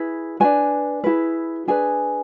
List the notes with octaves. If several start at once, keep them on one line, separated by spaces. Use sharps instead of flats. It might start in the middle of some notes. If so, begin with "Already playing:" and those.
Already playing: E4 G#4 B4
D4 F#4 B4 G#5
E4 G#4 B4
D4 G#4 B4 G#5